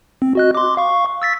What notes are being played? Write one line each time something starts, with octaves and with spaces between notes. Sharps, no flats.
C4
F#4 D#5 F#6
C6 D6
F5 C#6
E6 A6 B6